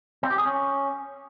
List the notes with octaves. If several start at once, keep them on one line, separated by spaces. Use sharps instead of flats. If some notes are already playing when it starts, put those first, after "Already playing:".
C4
G4
G#4
C#4